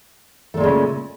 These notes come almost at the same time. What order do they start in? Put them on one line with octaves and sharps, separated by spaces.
A3 A#2 G#3 C#3